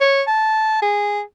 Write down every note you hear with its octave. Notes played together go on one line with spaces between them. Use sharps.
C#5
A5
G#4